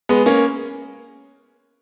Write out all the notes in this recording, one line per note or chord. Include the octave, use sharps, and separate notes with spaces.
G#3 B3
A#3 C#4